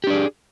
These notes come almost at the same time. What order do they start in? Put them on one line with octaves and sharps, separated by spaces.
G4 D4 D5 G#4